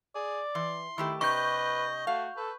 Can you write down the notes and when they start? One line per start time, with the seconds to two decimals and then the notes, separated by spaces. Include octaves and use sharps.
0.15 G#4 D5
0.55 E3 C6
0.98 D#3 A3 E4 G4
1.21 C3 D4 G4 B4 D#5 C#6 G6
2.07 A3 F#4 F5
2.37 A4 B4